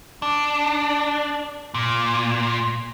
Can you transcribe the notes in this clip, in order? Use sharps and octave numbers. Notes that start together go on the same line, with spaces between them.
D4
A#2